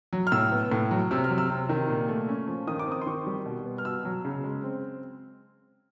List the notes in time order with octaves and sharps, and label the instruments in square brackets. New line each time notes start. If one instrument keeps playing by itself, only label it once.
[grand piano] F#3
F6
A2 E6
B3
A2
F#3
C3 E6
F6
F#3
E6
C3
D#3
A#2
A3
C#4
F3
D#3 D#6
D6
C4 D#6
C6
D#3 C#6
G3
B2
B3
F6
B2 E6
F#3
C#3
G#3
C4